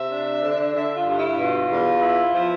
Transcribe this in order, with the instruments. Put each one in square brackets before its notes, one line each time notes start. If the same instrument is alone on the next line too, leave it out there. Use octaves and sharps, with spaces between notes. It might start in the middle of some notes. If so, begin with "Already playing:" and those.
Already playing: [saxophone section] C3 E5
D4
D3
D3 E5
F4
G2
E4
B2 F4
E2
E4
F3